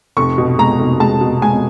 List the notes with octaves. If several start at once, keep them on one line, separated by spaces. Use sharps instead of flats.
F1 C#6
B2
G#3 A#5
F1
G#3 A5
B2
G#3 G#5